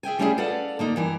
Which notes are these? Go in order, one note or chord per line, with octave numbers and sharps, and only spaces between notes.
G#4 E5 G5 G#5
G3 A3 C#4 E4 F#4 G#4
A4 B4 D5 F5 F#5 A5
D3 A#3 D#4
G2 E3 A#4